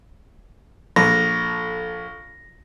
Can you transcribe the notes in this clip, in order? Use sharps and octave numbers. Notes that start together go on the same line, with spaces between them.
A#1 A4 A#6